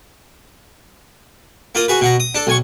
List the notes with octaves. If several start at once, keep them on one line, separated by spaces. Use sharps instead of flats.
A#3 F4 D#6
F#4 G#4 B4
B2 F#5 A#5
D#6
D4 A4
B1 G#5 C#6